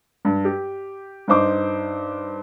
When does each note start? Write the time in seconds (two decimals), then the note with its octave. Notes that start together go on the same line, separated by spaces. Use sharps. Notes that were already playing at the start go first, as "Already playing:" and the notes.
0.25 G2
0.45 G4
1.28 G2 D#4 C5 D6